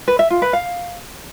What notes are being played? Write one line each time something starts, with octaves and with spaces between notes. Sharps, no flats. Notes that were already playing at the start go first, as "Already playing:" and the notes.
B4
E5
F4
B4
F5